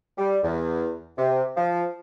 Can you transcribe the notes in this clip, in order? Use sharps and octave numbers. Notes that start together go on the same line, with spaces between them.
G3
E2
C3
F3